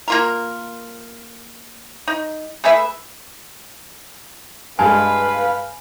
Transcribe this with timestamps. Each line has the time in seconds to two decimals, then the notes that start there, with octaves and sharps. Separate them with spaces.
0.08 A#3 F4 A#4
2.08 D#4
2.64 A3 G#4 B4 E5
4.79 G2 G#3 B4 F5 G#5